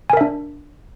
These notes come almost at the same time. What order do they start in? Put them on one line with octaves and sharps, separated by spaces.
G#5 A#4 E5 D4